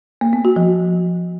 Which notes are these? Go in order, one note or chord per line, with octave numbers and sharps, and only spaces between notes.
A#3
B3
F#4
F3